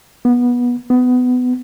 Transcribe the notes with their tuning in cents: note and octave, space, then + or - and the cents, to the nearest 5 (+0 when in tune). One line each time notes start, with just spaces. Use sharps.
B3 -20
B3 +20